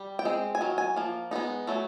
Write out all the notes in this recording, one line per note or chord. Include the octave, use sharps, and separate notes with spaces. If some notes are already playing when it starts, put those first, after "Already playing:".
Already playing: G3
G5
G#3 C4
G#5
D#3 F#3
G#5
F3 A#3
G#3 B3 D#4
F#3 A3